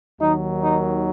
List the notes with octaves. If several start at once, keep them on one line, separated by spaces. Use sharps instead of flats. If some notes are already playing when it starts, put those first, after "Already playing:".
D#2 D#3 F#3 D#4
D#4